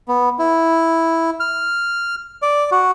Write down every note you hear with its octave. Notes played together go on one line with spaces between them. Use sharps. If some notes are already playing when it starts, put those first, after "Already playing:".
B3
E4
F6
D5
F#4